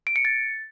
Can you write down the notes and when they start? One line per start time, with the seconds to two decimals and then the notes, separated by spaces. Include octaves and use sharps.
0.07 D7
0.16 C#7
0.25 A6